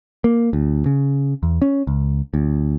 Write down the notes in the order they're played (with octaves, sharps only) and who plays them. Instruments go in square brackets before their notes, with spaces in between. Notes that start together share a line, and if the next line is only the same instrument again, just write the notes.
[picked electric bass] A#3
D2
C#3
E2
C#4
C#2
D2